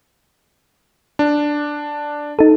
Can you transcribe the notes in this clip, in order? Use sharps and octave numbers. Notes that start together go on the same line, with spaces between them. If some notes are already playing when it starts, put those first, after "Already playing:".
D4
D#4 A4